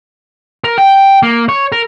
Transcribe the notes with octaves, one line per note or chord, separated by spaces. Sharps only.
A#4
G5
A#3
C#5
A#4